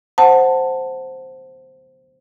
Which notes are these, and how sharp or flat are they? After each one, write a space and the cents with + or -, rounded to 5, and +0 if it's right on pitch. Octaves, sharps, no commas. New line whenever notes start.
C5 +0 F#5 +0 A5 +10